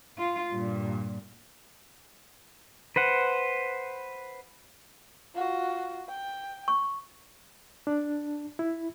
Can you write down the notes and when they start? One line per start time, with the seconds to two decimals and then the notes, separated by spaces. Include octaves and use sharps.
0.18 F4
0.51 G2 A#2
2.96 B4 C5 F#5
5.34 F4 F#4
6.09 G5
6.68 C#6
7.87 D4
8.59 E4